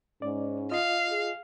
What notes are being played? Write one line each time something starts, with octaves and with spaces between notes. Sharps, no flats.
G#2 C#4 D5
F4 D#5 F5
G#4